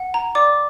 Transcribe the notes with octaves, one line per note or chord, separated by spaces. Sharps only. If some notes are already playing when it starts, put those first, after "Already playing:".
Already playing: F#5
A#5
D5 D6